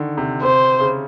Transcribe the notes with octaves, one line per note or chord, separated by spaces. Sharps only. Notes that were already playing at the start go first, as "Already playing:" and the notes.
Already playing: D3 D#3
C3
C3 C5
C#3